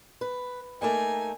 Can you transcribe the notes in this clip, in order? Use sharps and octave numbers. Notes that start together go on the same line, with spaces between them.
B4
A3 A#3 D#4 G#5